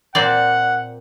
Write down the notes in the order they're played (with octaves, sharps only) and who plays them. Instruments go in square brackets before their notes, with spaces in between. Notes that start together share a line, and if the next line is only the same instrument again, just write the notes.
[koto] A#2 C4 D5 [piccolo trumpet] F#5